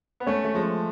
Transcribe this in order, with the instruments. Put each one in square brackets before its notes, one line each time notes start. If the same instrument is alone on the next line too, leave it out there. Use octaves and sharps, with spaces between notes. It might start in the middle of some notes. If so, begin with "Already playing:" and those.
[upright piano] B3
[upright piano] A3 [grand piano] C#4
[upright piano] A3
[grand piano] F3 [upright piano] G#3